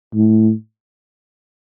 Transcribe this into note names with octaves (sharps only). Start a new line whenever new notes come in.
A2